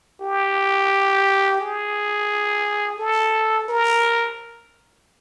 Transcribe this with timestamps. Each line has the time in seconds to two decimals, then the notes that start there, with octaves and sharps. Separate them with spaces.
0.21 G4
1.61 G#4
2.99 A4
3.68 A#4